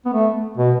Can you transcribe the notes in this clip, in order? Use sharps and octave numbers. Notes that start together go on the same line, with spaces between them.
B3
A3
B2